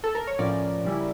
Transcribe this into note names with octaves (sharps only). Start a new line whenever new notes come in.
A4
A#4
C#5
A2 F3 C#4 A#4 D5
C#3 G3 C#4 E4